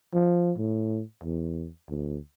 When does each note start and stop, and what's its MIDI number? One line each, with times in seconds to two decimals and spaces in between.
0.14 0.52 53
0.57 1.01 45
1.23 1.69 40
1.89 2.18 38